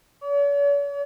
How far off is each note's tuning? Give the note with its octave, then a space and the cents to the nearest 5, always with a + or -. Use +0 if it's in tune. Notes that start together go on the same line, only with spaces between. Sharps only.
C#5 +45